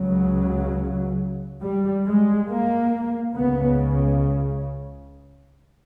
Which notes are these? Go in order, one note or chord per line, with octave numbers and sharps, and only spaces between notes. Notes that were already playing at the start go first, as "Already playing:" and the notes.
Already playing: C#2 C#3 F#3
G3
G#3
A#3
C#2 C#3 B3